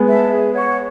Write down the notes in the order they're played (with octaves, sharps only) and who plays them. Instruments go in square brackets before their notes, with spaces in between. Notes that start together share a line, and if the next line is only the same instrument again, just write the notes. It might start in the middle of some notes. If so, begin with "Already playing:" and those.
Already playing: [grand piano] G#3 B3
[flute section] E5 A5
G#4
C#5 F#5 C#6